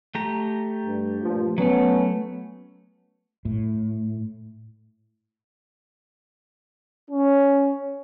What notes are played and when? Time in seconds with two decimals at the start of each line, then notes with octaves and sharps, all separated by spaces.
0.15 A3 G4 A#5
0.87 G2
1.22 G2 A#2 F3
1.58 F#3 A3 B3 C#4
3.45 A2
7.11 C#4